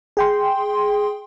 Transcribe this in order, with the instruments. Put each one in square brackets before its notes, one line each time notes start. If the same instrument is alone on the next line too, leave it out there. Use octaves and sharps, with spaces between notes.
[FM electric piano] G#4 G5 C6